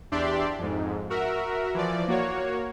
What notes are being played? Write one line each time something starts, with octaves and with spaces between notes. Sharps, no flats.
E2 D4 G4 D5 E5 C6
F2 G#2
F#4 A#4 E5
E3 F3 D5
A#3 F#4 C#5